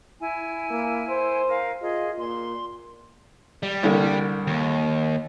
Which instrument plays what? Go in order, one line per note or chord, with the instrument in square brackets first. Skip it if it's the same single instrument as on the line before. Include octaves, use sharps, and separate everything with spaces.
[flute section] E4 G#5
[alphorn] A#3
C5
[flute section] A#4 F5
[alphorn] F4 [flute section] G#4 D#5
[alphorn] A#2 [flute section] C6
[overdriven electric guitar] G3
[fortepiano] C2 D3 A#3
[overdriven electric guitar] D#2